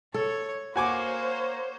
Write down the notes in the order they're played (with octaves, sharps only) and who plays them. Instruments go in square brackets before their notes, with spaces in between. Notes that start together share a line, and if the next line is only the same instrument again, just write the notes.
[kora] A4 [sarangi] C#5
[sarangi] A#3 [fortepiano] F#4 G#5 D6 [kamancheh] C5 C#5